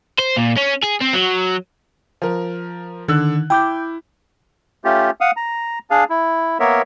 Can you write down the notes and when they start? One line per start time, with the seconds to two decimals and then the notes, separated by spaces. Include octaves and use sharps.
0.19 C5
0.37 A#2
0.57 C#4
0.84 G#4
1.01 C4
1.14 F#3
2.22 F3 A#4
3.08 D3 D#3 E6 F#6
3.50 E4 G5 D6 G6
4.84 A3 C#4 F4 G4
5.21 F5 F#5 D#6
5.37 A#5
5.91 D4 G#4 F5
6.10 E4
6.60 A#3 B3 A#4 C#5 E5